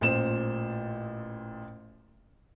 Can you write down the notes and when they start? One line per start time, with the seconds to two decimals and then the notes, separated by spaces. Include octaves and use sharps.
0.01 A1 A#2 C5 E7